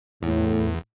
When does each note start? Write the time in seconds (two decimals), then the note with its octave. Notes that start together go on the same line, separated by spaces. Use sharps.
0.23 E2 A2